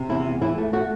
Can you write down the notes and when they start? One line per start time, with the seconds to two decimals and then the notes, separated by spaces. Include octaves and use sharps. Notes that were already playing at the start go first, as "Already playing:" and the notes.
Already playing: C3
0.09 E2 E4
0.25 E2
0.41 E3 E4
0.58 A3
0.73 A3 F#4